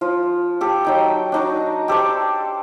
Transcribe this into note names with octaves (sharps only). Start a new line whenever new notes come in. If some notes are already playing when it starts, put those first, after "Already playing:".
F3 F4
G4 A4
F#3 D#4 G5
D4 D#4 F#4
G4 A4 C5 D5